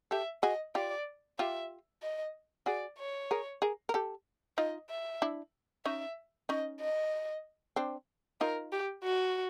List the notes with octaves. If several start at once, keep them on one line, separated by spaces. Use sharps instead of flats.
G4 A4 E5
F#4 G#4 D#5
F4 G4 D5
F4 G4 E5
D#5
F#4 G#4 D5
C#5
G#4 A#4
G#4 A#4
A#4
G4 A4
D#4 F4 D#5
E5
D4 E4
C#4 D#4 E5
C#4 D#4 D#5
D#5
C4 D4
D#4 F4 A#4
G4
F#4